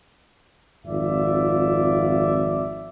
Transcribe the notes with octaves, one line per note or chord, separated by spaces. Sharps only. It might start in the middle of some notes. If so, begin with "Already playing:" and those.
G#1 F2 F4 D5 E5